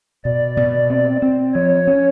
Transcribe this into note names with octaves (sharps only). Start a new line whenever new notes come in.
B2 D5
B2
C4
C4
F3 C#5
C#4